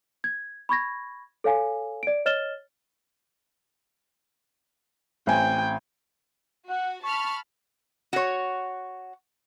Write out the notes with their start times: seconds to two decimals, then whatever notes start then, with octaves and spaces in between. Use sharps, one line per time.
0.24 G#6
0.69 B5 C#6 G#6 A#6
1.44 A4 C#5 F5 G#5
2.03 D5 D7
2.26 C#5 D#5 F6 A6 E7 G7
5.27 A1 C4 G5 G#5
6.69 F#4 F#5
7.04 A5 B5 C#6 F6
8.13 F#4 C#5